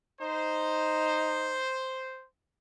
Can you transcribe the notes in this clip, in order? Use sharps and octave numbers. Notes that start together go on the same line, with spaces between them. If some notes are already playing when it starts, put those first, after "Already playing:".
D#4 C5